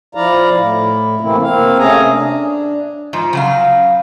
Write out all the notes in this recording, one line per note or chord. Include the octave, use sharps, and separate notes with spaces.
F3 E4 D5 F5 A#5
A2 E4
C3 E3 A3 A#3 C4 E4
A#3 C4 F5
C3 A3 C#4 G#4 G#5 A#5
D4
G#2 F3
C#3 F#3 F5